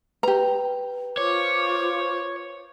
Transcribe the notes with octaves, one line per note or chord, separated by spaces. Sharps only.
G4 B4 A#5
F4 C5 C#5 D6